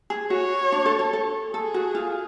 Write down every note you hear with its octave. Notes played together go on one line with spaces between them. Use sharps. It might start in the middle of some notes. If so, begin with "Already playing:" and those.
G#4
F#4 C#5
D4
A4
A4
A4
G#4 A4
F#4
F4